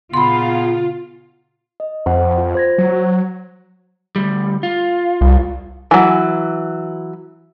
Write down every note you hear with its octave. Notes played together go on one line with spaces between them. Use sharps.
A#2 C#3 B3 F4 B5 C6
D#5
F2 C5 F#5
F4
C5 G#6 A#6
F#3
D2 G3
F4
C2
E3 F#3